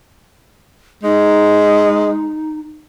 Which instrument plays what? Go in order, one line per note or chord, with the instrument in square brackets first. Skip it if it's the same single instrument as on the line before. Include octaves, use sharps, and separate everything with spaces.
[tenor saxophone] G#3 [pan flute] D#4